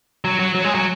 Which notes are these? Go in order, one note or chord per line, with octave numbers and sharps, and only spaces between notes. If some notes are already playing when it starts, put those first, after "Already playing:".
F#3
F#3
F#3
G#3
F#3